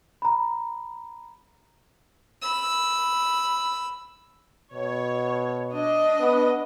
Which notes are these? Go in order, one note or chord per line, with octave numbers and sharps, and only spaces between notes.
A#5 B5
B5 E6
B2 C#5
D4 D#5
B3